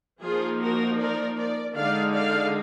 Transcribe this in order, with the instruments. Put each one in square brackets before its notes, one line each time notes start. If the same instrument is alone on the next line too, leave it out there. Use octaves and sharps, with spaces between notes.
[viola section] F3 A#3 D#4 F4 G#4
F#4 A#4
A#4 D5
A#4 D5
D3 G#3 D#4 D5 F5
D5 F5